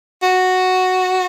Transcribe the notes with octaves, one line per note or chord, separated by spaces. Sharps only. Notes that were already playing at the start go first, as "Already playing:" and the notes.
F#4